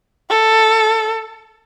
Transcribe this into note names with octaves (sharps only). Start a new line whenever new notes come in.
A4